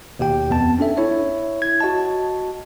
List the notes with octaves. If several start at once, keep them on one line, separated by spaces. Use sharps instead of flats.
D#2 B2 G4 G5
F2 B3 A5
C#4 D4 A4 E5
E4 C#5 E5
G#6
F#4 D#5 A5